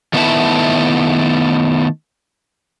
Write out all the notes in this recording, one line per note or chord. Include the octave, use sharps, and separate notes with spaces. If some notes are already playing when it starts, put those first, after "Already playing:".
D#3 A3 B3 E4 E5 A5